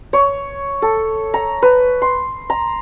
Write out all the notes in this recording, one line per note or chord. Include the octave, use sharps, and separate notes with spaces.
C#5
A4
A#5
B4
C6
A#5